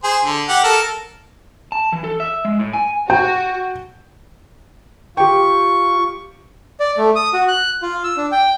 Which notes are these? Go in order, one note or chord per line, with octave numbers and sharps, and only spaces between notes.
G#4 C5
D3
G4 F#5
A4 A#4
A5
E3
A4
E5
G#3
A2
G#5
F#4 G5
F4 G4 G5 C#6
D5
A3
D#6
F#4
F#6
F4
E6
D4
G5